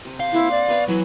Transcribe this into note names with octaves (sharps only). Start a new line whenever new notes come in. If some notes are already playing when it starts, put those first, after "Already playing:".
C3
F5 C6
A#3 C4 D4 E4
D5
B3 B4 C#5
E3 F#3 F#5